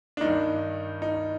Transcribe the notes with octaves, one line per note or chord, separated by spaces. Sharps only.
D4
G2 D#3 D#4
D#4